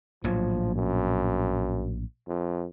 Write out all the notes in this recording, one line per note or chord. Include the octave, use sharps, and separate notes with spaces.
A#1 A2 F3 F#3
F#2
F2